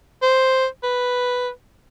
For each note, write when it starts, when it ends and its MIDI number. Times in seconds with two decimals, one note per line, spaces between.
0.22 0.66 72
0.83 1.49 71